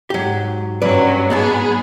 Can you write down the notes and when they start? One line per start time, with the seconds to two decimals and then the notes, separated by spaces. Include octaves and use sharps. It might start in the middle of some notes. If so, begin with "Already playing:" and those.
0.10 G#2 F#3 G4
0.82 G2 F#3 C#4 B4 D5
1.30 G#2 F#3 B3 G#4 A5